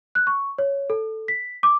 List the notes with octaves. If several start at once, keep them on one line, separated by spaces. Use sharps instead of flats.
F#6
C#6
C#5
A4
B6
D6